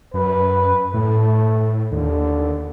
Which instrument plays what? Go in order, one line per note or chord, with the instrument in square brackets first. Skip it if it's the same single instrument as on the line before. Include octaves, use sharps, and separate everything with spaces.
[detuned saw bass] F#2 [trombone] B4
[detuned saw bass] A2 [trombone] A3
[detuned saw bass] D#2 [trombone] D3